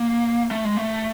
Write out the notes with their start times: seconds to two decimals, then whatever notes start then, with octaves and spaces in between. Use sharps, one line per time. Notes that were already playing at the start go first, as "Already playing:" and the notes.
Already playing: A#3
0.51 A3
0.65 G#3
0.77 A3